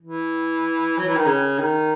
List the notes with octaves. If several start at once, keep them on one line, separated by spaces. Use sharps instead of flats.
E3
F#3
E3
D#3
C#3
D#3